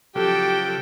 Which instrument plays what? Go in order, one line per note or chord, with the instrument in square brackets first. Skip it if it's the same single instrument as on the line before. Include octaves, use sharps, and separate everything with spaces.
[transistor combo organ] C#3 F3 F#3 [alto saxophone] G4 [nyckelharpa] A4 G5